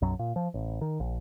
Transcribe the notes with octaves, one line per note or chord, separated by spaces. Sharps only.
B1 F#2 F#3
A#2
F3
A1
D#3
A#1